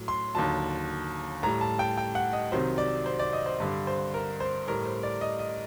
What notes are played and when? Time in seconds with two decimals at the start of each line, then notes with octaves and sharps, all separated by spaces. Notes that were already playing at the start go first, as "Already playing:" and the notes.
Already playing: A2 F#3
0.08 C6
0.35 D#2 D3 F#3 A5
1.43 A2 G3 A#5
1.61 A5
1.79 G5
1.98 G5
2.15 F#5
2.33 D#5
2.52 C2 C3 D#3 F#3 C5
2.78 D5
3.06 C5
3.19 D5
3.33 D#5
3.46 C5
3.60 G2 D3 G3
3.87 C5
4.14 A#4
4.40 C5
4.67 A2 G3 A#4
4.85 C5
5.03 D5
5.21 D#5
5.39 D#5